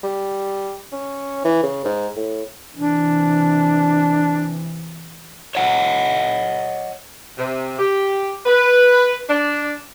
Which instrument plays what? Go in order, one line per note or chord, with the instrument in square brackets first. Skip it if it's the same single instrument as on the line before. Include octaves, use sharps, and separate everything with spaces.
[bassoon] G3
C#4
E3
C#3
G#2
A2
[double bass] C3 E3 [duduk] D4
[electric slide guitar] C#5 D#5 F#5
[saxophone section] C3
G4
B4
D4